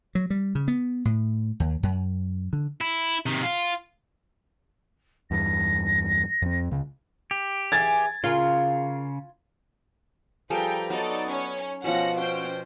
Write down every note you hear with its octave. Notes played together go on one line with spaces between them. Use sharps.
F#3
G3
C#3
B3
A2
D#2
F#2
D3
E4
C3 D#3
F4
E2 G2 A#6
F2 C4
C#2 C#3
G4
E3 G#4 G#5 G#6 A6
C#3 F4 G#4 A#4
F3 G3 G#4 A4 B4 G5 A#5
F#3 B3 D#4 A4 D5
C#4 C#5
B2 F3 C#4 F#5 A#6
C#4 F#4 C5 G5